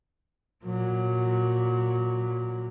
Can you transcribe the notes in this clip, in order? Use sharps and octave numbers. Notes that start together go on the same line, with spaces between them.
A#2 F#3